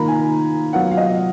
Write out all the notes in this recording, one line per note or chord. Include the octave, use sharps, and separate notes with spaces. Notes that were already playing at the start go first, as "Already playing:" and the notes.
Already playing: D#3 A#3 F4 A#5 B5
G#5
F#3 B3 F4 F#5
F5
D#5